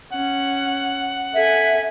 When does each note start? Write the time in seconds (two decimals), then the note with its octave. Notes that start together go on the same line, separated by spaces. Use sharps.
0.12 C#4 F#5
1.34 A4 E5 G#5